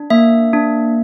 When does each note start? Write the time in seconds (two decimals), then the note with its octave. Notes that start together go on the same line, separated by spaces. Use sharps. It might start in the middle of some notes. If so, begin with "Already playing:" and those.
Already playing: D4
0.10 A#3 E5
0.53 D4